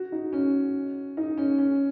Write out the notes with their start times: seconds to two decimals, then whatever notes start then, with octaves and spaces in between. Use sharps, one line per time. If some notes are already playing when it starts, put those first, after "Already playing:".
Already playing: F#4
0.12 D#4
0.33 C#4
1.17 D#4
1.38 C#4
1.58 C#4